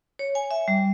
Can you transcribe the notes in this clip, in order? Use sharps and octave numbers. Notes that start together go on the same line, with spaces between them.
C#5
G#5
E5
G3